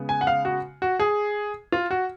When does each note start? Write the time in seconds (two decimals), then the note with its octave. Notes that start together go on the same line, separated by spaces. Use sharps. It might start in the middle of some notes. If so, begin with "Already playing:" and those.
Already playing: C#3 G#3 B3
0.09 G#5
0.21 F#5
0.27 F5
0.45 F#4
0.82 F#4
1.00 G#4
1.72 F4
1.91 F#4